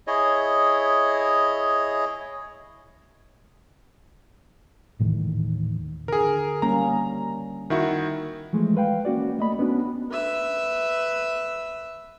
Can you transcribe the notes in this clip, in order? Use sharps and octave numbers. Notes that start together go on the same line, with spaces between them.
E4 G#4 C#5 D#5
D#1 A2 D#3 E3
D3 G#4 A#4
G3 A#3 C#4 A#5
D#3 E4 F#4
E3 F3 G#3 A3
B4 F5 G5
A#3 C#4 F#4 D5
A3 D#5 B5
B3 C#4 D4 F#4
B4 E5